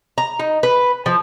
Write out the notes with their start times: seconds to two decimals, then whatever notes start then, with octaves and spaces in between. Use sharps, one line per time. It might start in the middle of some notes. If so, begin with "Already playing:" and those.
0.18 A#5
0.39 D#4
0.63 B4
1.06 F3